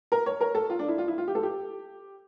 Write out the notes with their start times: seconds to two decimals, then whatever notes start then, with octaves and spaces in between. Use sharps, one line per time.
0.12 A#4
0.26 C#5
0.41 A#4
0.55 A4
0.70 F4
0.79 D4
0.88 E4
0.98 F4
1.08 E4
1.18 F4
1.28 G4
1.35 A4
1.43 G4